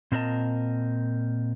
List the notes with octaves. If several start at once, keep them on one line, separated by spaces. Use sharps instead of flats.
A#2 C4 A#4 B4 D#5 A5